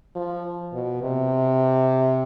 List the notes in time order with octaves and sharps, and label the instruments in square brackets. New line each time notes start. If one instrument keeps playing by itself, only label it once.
[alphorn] F3
B2
C3